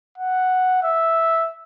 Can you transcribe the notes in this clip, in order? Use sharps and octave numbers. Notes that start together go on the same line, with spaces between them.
F#5
E5